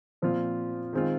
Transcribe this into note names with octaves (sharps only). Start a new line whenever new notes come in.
A#2 F3 C4 F4
D#3 G#3 C4 F4